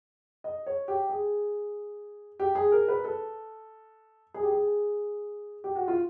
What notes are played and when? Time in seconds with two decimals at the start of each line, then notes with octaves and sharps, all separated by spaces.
0.44 D#5
0.66 C#5
0.88 G4
1.10 G#4
2.40 G4
2.55 G#4
2.72 A#4
2.88 B4
3.04 A4
4.34 G#4
4.43 G4
4.51 G#4
5.64 G4
5.76 F#4
5.88 F4